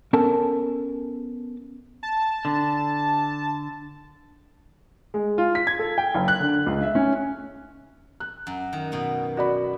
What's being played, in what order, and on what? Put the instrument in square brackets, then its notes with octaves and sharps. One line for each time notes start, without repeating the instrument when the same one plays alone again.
[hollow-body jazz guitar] B3 C#4 A4 A#4 A5
[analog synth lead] A5
[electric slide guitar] D3
[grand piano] G#3
F4
B6
G#6
A4
G5
F#1
F#6
D3
C#2
E5
C#4
[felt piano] F#6
[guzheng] F#2
D#3
B2 B3
[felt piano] F#4 D5 B5